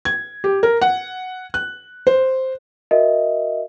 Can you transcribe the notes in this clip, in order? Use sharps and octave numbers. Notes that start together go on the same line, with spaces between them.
G#6
G4
A#4
F#5
F#6
C5
F#4 A#4 D#5 E5